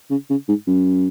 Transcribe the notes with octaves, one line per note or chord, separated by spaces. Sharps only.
C#3
C#3
G#2
F#2